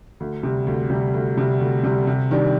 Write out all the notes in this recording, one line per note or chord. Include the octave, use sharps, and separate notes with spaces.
D2
C3 G3
D2
C3 G3
D2
C3 G3
D2
C3 G3
C3
D#3 G3 D4